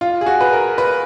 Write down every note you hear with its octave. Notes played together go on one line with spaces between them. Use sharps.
F4
G#4
F#4
B4
A#4
B4